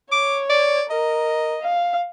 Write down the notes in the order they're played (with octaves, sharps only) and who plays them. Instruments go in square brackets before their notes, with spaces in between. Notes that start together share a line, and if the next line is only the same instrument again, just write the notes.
[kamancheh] C#5 [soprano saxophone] D6
[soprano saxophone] D5
[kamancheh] A#4 [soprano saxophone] D#5
[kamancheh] F5